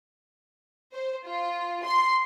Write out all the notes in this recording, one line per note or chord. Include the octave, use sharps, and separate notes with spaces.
C5
F4
C6